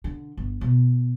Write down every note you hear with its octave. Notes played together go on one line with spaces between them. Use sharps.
D3
G1
B2